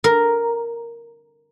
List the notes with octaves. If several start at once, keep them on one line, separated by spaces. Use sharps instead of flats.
A#4